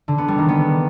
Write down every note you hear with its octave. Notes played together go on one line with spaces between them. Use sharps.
D3
B3
G3
D#3
B3